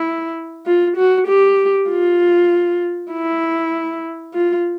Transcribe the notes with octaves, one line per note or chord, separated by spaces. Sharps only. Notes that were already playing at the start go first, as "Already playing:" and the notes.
Already playing: E4
F4
F#4
G4
F4
E4
F4